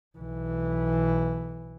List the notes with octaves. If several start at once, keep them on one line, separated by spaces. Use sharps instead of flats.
B1 E3